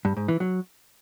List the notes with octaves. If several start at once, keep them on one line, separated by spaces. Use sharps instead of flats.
G2
G#2
E3
F#3